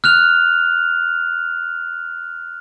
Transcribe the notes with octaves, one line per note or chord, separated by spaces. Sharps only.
F6 F#6 F7